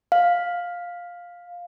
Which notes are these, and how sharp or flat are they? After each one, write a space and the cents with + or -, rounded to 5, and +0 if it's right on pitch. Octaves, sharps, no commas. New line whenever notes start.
F5 +10